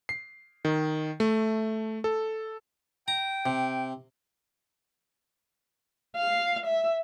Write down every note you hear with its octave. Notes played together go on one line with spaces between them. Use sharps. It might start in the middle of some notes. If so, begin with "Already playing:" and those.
C7
D#3
A3
A4
G5 A#5
C3
F5
E5